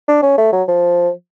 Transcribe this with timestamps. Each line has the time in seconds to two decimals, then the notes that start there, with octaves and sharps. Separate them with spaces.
0.08 D4
0.23 C#4
0.38 A3
0.53 F#3
0.68 F3